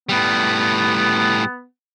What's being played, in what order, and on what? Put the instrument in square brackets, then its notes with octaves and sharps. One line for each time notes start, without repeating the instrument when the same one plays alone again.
[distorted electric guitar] A2 G3 [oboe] B3